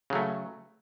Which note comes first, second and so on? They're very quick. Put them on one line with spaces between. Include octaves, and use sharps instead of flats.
C#3 F#3 A3